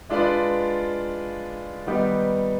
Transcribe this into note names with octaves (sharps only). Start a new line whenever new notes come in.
G#3 D4 F4 B4 D5
D#3 G3 B3 D#4 G4